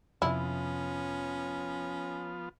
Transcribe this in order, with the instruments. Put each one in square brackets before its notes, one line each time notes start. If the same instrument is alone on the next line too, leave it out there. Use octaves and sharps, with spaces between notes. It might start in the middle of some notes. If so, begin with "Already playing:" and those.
[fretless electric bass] F2 C3 [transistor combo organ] F3 B3 F4 [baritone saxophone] C#4 [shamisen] E4